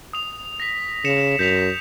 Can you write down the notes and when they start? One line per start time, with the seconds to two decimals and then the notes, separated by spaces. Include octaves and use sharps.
0.13 D#6 F7
0.60 A#6 B6
1.05 C#3 C#7 E7 F7
1.39 F#2 G6 B6 F7